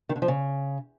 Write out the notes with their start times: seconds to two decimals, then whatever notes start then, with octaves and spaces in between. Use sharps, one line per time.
0.09 D#3
0.16 D3
0.22 F3
0.28 C#3